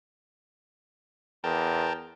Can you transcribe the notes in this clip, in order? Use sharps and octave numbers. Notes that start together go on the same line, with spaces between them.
E2 A#4 G5 A5